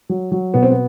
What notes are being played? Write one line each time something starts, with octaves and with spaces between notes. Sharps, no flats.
F#3
F#3
B2 B3
C4
B3